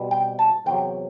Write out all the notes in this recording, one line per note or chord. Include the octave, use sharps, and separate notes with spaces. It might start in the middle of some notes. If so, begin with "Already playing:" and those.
Already playing: B2 G3 C4
G5
A5
E2 C3 F#3 G5